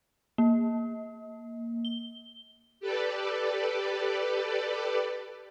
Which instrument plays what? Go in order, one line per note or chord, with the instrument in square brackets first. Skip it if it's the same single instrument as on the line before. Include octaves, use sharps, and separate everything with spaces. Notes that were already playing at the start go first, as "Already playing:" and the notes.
[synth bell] A#3
G7
[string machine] G4 A4 B4 D5